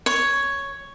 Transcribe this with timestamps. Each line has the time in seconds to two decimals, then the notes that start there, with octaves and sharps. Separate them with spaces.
0.06 C#5